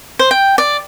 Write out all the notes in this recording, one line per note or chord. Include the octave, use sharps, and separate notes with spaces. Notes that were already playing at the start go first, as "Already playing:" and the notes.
C5
G5
D5